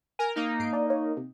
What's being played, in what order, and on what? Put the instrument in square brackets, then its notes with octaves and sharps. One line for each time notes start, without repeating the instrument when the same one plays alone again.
[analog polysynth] A#4 [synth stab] G#5
[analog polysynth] A#3 D#4 [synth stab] F6
[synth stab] G#2 C7 D7
D4 D5
C#5
C3